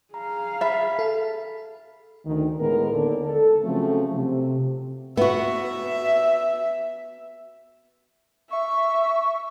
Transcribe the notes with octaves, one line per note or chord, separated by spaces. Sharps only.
G#4 F5 A#5
E5 B5 A6
A4
D2 D#3
A2 G#3 B3 A#4
D#2 D3
A4
C#3 F3 F#3 A3 C4
C3
B3 F#4 E5
E5 C#6